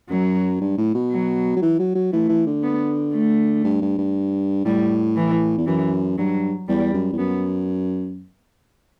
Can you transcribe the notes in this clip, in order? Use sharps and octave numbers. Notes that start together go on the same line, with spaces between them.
F#2 F#3
G2
A2
B2
F#3
F#3
E3
F#3
F#3
E3 A3
E3
D3
B3
A3
G2
G2
G2
A2 G3
E3
E2
F#2 E3
G2 F#3
E2 G3
F#2
E2
F#2 B3